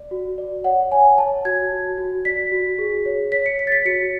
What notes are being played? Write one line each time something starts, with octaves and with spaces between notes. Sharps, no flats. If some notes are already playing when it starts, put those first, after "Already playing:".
Already playing: D5
F#4
D5
C#5 F#5
C#5 G#5
C#5 A5
F#4 G#6
F#4
F#4
D5 B6
F#4
G#4
C#5
C#5 B6
C#7
C#5 B6
A6
B6
F#4 C#7